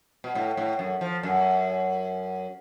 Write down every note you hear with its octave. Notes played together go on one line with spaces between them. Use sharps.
B2
A2
A2
F#2
F3
F#2